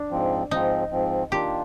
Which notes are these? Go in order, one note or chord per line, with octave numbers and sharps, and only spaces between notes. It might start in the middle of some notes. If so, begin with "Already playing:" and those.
Already playing: D4
G#2 F3 C4
G#2 F3 C4 D#4
G#2 F3 C4
D#3 A#3 D4 F4 G4